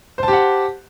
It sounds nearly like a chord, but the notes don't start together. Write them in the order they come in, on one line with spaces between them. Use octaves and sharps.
C5 A5 G4 F#5